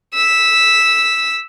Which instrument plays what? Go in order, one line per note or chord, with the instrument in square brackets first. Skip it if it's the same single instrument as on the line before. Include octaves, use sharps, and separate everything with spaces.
[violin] E6 B6